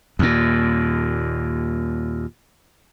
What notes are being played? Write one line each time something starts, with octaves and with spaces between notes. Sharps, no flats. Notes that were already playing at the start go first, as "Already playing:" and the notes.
D#2 A#2